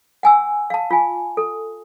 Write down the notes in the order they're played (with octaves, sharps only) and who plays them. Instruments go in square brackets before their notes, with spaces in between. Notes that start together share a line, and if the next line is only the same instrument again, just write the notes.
[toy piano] F#5 G#5 E6
F5 A5
F4 G#5
A4